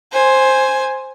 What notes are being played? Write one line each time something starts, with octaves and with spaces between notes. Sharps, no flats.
C5 G#5